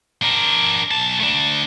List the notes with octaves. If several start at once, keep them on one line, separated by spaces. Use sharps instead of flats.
D4 A#4
B1 A5
A3 D4